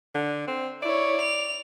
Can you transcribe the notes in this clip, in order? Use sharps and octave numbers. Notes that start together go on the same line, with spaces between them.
D3
C4
E4 C#5 D5
F7